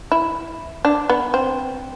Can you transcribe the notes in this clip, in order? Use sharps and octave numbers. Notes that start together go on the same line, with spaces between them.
E4
D4
B3
C4